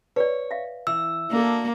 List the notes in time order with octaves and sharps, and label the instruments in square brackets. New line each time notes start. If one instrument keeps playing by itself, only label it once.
[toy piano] B4 D5 [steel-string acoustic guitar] C#5
[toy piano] E5 F5
[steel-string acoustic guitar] E3 [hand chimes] E6
[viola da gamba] A#3 [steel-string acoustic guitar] D4 F#4 A4